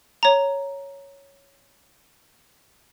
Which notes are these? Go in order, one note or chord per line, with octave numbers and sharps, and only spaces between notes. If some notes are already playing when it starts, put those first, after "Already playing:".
C#5 A#5